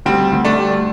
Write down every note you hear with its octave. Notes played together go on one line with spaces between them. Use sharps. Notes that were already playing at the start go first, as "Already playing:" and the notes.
D2 G3 C4
D2
A3 D4
G3